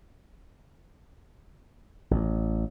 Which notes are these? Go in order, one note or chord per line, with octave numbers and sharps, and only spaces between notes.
A1